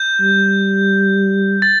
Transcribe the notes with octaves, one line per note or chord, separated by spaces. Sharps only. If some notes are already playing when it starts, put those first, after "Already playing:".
Already playing: G6
G3
A6